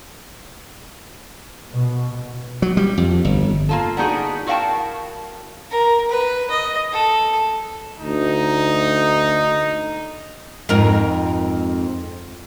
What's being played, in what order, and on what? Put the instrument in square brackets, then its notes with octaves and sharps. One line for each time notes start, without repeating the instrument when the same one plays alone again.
[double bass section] B2
[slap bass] F#3
G3
F2
G1
[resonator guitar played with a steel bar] A#3 F4 A4
B3 D4 D#4 F#4 G#4
E4 F#4 A#4 F5 G5 A5
[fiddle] A#4
B4
D#5
A4
[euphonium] D2 [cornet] D#4
[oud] F2 G#2 A#4